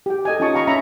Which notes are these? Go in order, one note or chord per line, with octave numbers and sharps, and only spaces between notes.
G4 G5
A4 D#5 G#5
C#4 D#4 F4 A5 C#6 D#6
F5 G5 A#5 B5 C#6
C#4 E5 A#5 B5